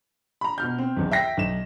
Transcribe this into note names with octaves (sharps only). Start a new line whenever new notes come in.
A#5 B5
B2 F6 G6
C4
B1 E2
E5 G5 A#6 B6
B1 E7